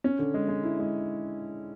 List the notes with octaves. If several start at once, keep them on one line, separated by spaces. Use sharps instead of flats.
C#4
D3
G#3
G#3
E4
G#3